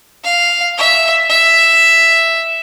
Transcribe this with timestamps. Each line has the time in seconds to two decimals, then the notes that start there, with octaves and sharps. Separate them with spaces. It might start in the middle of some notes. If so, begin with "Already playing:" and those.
0.24 F5
0.78 E5
1.30 E5